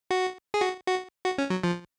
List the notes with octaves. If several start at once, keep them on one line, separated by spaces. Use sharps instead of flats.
F#4
G#4
F#4
F#4
F#4
C#4
F#3
F3